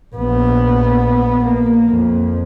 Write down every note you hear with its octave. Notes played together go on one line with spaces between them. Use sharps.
A#1 B3
A#3
F2